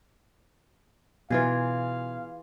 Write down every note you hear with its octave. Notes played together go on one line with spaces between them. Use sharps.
B2 E3 F4 G#4 F5